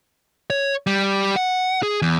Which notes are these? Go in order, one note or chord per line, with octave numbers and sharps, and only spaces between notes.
C#5
G3
F#5
G#4
E2